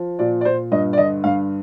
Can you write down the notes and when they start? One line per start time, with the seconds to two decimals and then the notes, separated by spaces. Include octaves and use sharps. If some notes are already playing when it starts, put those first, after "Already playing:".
Already playing: F3
0.19 A#2 D5
0.41 D5
0.45 A#2 C5
0.72 G2 D#5
0.93 D5
0.98 D3 D#5
1.24 G2 F5